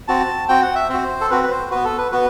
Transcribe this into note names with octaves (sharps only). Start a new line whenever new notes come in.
C4 F#4 A5
C4 F#4 G5
F#5
E5
C4 F#4 C5
A4
C4 F#4 B4
B4
C5
B3 F#4 B4
A4
B4
B3 F#4 B4